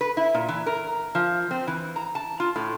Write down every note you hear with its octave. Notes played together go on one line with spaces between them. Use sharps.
B4
E4
A#2
E3
A#4
F3
C4
E3
A#5
A5
F4
A2